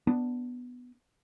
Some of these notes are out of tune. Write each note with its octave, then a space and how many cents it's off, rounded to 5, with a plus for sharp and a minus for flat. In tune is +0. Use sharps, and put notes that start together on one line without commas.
B3 +0 D4 +0